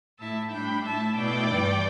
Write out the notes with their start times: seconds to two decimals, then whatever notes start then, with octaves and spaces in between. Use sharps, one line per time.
0.19 A2 A3 E4 E5 A5
0.51 A2 G3 D4 G5 B5
0.84 A2 A3 E4 E5 A5
1.17 B2 A3 E4 D5 G5
1.50 G2 E3 G3